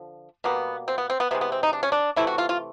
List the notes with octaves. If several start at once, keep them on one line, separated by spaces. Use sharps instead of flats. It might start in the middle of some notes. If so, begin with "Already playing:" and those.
Already playing: D3 F3
B2 G3 A#3 B3
C4
B3
C4
B3
C3 E3 G#3 B3
B3
C4
D#4
D4
C#4
D4
C3 E3 A3 E4
F#4
F4
F4